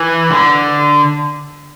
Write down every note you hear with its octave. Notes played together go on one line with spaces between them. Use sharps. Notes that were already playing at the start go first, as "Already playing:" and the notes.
Already playing: E3
D3